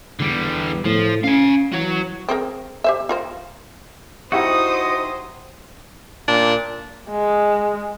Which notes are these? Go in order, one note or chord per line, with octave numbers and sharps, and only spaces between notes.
E2 D3 G3
A2 F3
C#4 F5 G#5
E3 F#4 C#5
C4 G#4 A#4
G4 C5 E5
F4 A#4 C5
D#4 E4 F#4 G4 C5 F#5 D#6
A#2 D4
G#3